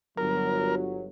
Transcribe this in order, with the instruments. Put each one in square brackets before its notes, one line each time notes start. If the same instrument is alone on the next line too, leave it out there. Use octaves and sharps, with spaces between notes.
[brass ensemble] G1 F#3 [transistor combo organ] A#4